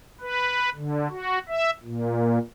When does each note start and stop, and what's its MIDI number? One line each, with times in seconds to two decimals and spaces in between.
0.21 0.70 71
0.75 1.08 50
1.10 1.39 66
1.49 1.70 76
1.84 2.39 46